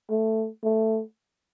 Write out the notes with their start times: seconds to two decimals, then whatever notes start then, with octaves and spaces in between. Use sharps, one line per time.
0.10 A3
0.64 A3